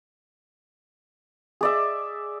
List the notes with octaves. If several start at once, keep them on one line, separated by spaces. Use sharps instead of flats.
G#4 D5 E5